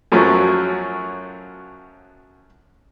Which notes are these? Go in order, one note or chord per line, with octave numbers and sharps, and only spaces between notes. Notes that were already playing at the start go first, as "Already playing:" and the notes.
F#2 F3 F#3 A3 C#4